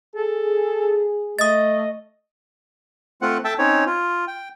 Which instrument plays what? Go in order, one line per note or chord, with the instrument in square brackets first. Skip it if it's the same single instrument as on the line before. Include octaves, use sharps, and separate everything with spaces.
[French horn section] G#4 [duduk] A4
[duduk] A3 [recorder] D#5 [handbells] D#6 A6
[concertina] A3 C4 F4 F#5
A4 E5 G5 A5
C4 C#4 D#4 C#5
F4
G5